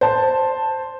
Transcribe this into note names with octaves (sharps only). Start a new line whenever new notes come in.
C5 A5